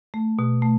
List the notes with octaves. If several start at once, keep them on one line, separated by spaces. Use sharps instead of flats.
A3
B2
A3